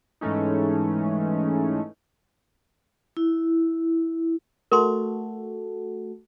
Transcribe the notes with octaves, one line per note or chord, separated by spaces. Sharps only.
G#2 E3 G#3 A3 C#4 D#4
E4
A3 F#4 A4 A#4 C6